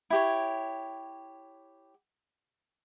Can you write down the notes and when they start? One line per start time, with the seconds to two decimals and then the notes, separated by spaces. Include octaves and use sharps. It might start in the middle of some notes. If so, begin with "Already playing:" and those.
0.10 E4 G4 C#5